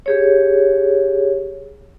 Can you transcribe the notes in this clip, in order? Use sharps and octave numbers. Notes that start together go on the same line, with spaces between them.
G4 G#4 C#5